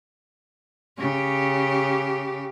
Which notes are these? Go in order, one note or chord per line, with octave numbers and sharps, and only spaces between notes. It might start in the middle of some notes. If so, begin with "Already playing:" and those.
C#3 G4